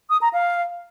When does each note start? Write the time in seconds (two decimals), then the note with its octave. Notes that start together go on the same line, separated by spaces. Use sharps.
0.10 D#6
0.22 A#5
0.33 F5